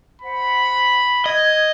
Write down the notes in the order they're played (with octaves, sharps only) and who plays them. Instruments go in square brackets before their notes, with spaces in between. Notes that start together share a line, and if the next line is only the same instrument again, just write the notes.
[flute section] C5 F#5 [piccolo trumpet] B5
[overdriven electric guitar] D#5 [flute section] D#6 G#6